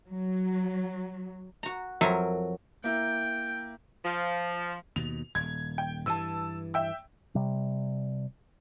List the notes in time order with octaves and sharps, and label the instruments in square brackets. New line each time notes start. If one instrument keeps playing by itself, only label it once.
[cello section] F#3
[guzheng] F#4 A#5
F2 F#3 A#4 E5 G#5
[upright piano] A#3 E4 [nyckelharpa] G5
[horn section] F3
[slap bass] D#2 B2 [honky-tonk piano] F7
[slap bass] D#1 [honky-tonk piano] G#6
[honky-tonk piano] G5
[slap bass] G2 E3 [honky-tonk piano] A5 E6
[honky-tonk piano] E5 G5 E6
[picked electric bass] C3 G3